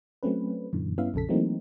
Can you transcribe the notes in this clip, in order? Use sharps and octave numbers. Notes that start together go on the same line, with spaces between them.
F#3 A3 C4 C#4 B4
F#2 A#2 D3 E3
G2 B3 C#4 E4 E5 F5
A#1 F2 C#3 A4 B6
E3 F#3 A3 A#3 C4 D#4